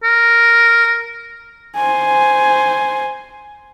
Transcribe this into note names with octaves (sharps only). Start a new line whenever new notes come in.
A#4
C5 G#5